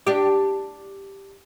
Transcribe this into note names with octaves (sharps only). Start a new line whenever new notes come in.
D4 G4